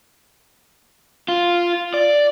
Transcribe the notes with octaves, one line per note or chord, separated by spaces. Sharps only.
F4
D5